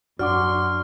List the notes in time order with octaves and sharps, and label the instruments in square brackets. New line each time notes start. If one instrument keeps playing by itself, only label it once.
[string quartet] F#2 C6 [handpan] D4 F#4 [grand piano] D5 F#5 D6 [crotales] F6